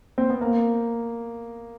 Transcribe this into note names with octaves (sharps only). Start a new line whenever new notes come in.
C4
B3
A#3